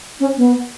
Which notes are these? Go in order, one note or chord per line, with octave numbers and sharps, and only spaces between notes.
C#4
B3